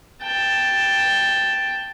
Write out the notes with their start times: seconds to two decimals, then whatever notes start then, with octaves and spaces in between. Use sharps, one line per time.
0.24 G5 A5